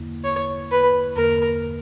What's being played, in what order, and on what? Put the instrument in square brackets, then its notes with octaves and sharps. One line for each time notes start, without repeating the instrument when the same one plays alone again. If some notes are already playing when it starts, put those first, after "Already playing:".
Already playing: [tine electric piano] E2 D3 A#3 E4
[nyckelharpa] C#5
B4
[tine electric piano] E2 D3 A#3 [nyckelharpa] A#4